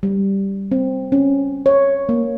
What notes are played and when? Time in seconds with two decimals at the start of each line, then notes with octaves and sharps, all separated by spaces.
0.03 G3
0.72 C4
1.12 C#4
1.66 C#5
2.09 A#3